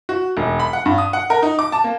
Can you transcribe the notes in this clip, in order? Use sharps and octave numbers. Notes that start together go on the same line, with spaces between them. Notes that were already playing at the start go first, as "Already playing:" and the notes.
F#4
E1
B5
F#5
G2
D#6
F#5
A#4
D#4
D6
A5
A#3